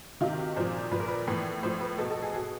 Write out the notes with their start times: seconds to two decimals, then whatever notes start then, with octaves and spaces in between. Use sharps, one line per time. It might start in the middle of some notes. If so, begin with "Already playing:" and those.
0.21 C3 D#3 F4
0.39 F#4
0.56 A#2 F3 C5
0.92 A#2 F3 B4
1.00 A#4
1.08 B4
1.27 A2 E3
1.63 A2 F3 C5
1.81 B4
1.98 B2 A4
2.11 A4
2.22 G#4
2.33 B2 F#4